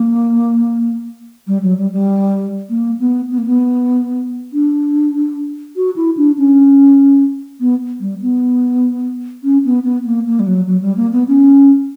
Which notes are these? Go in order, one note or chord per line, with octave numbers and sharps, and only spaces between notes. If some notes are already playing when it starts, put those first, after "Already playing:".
Already playing: A#3
G3
F#3
G3
G3
A#3
B3
B3
A#3
B3
D4
F#4
E4
D4
C#4
B3
G3
B3
C#4
B3
B3
A#3
A#3
G3
F#3
F#3
G3
A#3
B3
C#4